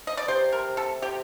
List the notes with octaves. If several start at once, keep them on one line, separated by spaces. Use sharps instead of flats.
D#5
D5
C3 C5
A#4
A4
C3 G4